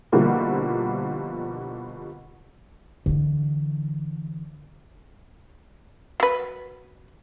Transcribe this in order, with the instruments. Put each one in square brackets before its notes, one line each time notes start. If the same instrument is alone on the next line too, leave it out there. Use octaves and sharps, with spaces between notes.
[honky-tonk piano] B2 D3 F3 G3 A#3 E4
[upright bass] D3 E3
[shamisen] F#3 B4